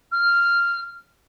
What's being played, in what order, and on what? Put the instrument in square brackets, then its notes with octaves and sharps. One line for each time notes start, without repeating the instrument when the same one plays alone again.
[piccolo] F6